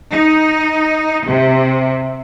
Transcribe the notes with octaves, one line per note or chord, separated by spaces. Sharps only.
D#4
C3